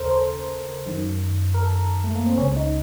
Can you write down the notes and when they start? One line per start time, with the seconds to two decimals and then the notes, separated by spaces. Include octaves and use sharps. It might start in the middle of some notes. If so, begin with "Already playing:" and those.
Already playing: D#2 C#3 A4 A#4 C5
0.11 C5
0.87 F#2 D#3
1.54 A#4
1.62 A4
2.04 A3
2.15 A#3
2.26 C4
2.37 C#2 C#3 C#4
2.56 D#4